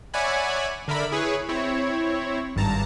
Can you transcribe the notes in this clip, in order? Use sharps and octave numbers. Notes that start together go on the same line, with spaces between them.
C#5 D5 E5 F#5 G#5 B5
D3 A#4 D5 E5 B5
E4 G#4 B4 C#5
C4 E4 C#5
G#1 G2 A5 A#5